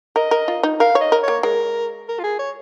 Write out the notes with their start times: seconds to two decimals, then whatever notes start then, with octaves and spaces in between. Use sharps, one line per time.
0.16 A#4 D#5
0.31 A#4
0.48 F4
0.63 D#4
0.80 A#4 F5
0.95 C#5
1.01 D#5
1.12 A#4
1.23 A#3 C#5
1.43 G#3 A#4
2.08 A#4
2.19 F4
2.23 G#4
2.39 C#5